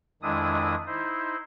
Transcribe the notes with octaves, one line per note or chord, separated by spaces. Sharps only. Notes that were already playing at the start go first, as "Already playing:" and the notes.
F2 D#3 G#3 D4 E4 D#6
D#4 E4 C5